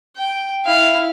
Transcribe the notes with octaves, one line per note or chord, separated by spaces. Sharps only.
G5
E4 F5